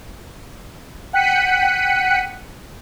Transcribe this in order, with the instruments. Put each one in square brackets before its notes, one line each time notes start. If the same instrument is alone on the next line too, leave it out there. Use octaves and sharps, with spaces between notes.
[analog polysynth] F#5 G5 F#6 B6 C#7 D#7